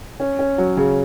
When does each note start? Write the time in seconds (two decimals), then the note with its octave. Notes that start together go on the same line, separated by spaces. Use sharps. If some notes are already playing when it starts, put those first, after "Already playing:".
0.20 C#4
0.39 C#4
0.58 F#3
0.77 C#3